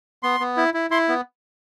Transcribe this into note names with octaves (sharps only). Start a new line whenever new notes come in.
B3 C6
B3
E4
E4
E4 C6
B3